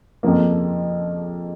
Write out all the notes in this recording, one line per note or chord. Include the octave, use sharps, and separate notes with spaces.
F2 C#3 F3 A#3